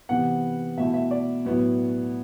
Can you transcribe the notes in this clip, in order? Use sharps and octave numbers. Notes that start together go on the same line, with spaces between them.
C3 E3 B3 F#5
B2 A3 E4 E5
E5
D5
A2 F#3 B3 E4